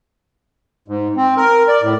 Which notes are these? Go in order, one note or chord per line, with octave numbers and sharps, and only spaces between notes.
G#2
C4
A#4
D5
A2